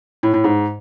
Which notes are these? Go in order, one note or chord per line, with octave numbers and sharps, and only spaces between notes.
A2
A2
G#2